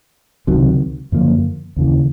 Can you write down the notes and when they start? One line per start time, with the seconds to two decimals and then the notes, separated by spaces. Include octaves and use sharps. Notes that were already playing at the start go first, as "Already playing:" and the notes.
0.47 C#2 C3 D#3 F#3
1.12 F#2 D3 F3 A#3
1.76 D#2 C#3 E3